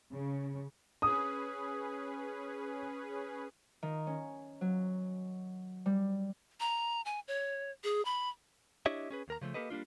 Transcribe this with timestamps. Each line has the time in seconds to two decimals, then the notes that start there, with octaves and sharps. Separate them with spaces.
0.13 C#3
1.02 C#4 G#4 B4 D#6
3.83 D#3
4.07 C#4
4.61 F#3
5.86 G3
6.60 A#5
7.05 G#5
7.28 C#5
7.84 G#4
8.05 B5
8.86 D4 E4 G4 C#5 D#5 E5
9.11 C#4 G#4 B4
9.28 D#2 A#4 A#5
9.41 C#3 F3 G#3 A3
9.54 A#3 C4 G4 A4 B4 D#5
9.70 G3 A#3 D4 F4